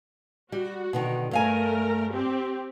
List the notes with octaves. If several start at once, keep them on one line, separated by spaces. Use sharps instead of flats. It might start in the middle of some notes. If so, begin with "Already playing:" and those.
G3 F#4
B2 D3 D#3
G2 A3 A#4 F5 G#5
C4 G4